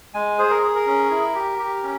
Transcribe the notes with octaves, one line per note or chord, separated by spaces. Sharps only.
G#3 G#5
G#4 C5
A#4
G#4
A#4
C#4
E4
G4
G4
C#4